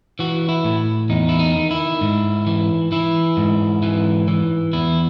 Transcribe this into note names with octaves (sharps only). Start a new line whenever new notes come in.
E3 F#4
E4
A2
E2 D#4
E4
D#4
D#3
E4
G#2
E3
E3 E4
G#2
E3
E3
E2 E4